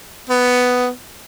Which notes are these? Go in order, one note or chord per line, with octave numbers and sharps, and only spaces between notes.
B3